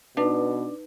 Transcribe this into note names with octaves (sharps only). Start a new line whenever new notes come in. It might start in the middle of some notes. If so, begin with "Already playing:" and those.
B2 D4 D#4 B4